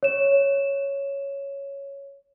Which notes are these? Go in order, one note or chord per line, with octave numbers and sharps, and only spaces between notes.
C#5 E7